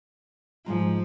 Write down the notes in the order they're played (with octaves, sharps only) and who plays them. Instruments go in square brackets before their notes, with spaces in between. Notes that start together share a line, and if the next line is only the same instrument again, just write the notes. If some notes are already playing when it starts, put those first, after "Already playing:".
[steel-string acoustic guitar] G#2 G#3 A#5 [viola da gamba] F3